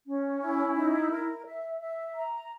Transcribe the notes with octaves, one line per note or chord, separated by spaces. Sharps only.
C#4
E4
D#4
A#4
E5
E5
A#5